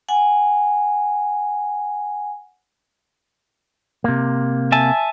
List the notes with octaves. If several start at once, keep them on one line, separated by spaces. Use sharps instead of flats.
F#5 G#5
C3 A#3
E5 G#5 A5